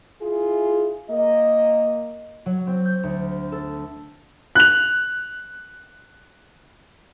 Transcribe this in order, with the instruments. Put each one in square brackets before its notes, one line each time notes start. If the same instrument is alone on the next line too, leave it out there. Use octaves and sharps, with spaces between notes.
[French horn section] E4 F4 G#4
A#3 D#5
[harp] F#3
C4
G6
D2
A4
[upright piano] F#6 F7